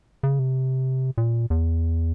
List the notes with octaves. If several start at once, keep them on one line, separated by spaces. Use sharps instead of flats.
C#3
C3
A#2
E2